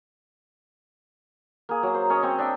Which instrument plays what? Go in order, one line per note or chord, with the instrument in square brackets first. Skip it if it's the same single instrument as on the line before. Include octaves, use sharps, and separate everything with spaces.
[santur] A#3 G#4
F#3 A#5
C5
C#4 C#5 D#5
C4 D#5 C#6
D4 E5 G5